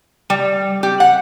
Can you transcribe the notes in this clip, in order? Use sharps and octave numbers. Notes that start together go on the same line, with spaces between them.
G3
G4
F#5